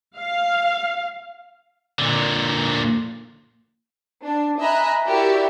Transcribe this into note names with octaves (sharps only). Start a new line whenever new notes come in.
F5
A#2 D3
D4
D#5 E5 G#5 A#5 B5 F#6
E4 F#4 G4 A#4 D5 E5